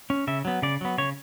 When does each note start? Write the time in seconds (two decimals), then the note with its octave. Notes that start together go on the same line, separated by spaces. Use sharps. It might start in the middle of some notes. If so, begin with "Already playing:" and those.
0.10 C#4
0.27 C#3 E5
0.45 F#3 B3
0.62 C#3 D5
0.81 F#3 B3
0.98 C#3 C#5